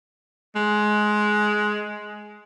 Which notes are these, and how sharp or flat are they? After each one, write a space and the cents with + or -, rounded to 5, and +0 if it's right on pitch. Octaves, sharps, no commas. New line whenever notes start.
G#3 +15